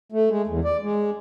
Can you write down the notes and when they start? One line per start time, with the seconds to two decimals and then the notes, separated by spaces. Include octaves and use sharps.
0.12 A3
0.30 G#3
0.47 E2
0.64 D5
0.82 G#3